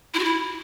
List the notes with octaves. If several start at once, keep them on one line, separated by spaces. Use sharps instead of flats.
E4
F#4
E4